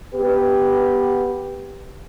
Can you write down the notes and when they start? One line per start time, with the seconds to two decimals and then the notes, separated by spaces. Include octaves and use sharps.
0.14 B3 G4 B4